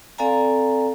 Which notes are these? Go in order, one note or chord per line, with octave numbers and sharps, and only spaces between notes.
C4 A4 D5 F5 G#5 A#5